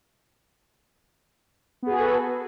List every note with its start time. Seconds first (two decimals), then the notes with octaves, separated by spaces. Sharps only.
1.82 B3
1.87 G#4
1.91 F#4
1.95 B4
1.99 A4